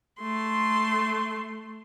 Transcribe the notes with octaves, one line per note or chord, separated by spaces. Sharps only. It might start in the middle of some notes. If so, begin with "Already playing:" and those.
A3 C6